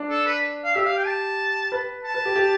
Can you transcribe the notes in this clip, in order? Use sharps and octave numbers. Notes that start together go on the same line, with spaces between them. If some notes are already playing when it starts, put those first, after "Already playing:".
Already playing: D4
A4
B4
F5
G4 E5
F5
G5
A5
B4
A5
B4
G4
G4